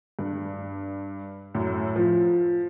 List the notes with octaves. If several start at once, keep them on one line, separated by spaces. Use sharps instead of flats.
G2
F#2 A2
F3